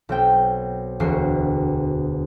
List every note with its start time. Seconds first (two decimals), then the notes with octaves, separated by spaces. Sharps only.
0.09 B1 C4 G5
1.00 E1 D2 C4 F#4 C7